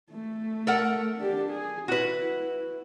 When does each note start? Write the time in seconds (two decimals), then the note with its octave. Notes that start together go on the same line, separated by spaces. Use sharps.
0.11 A3
0.67 A4 A#4 F#5
1.18 D4 G4
1.51 G#4
1.88 E4 F#4 B4